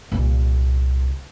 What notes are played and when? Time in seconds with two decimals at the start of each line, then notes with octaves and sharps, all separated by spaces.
0.12 C2 A#2